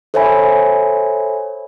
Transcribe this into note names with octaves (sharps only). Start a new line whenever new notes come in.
A4 C5 C#5 E5 G#5 B5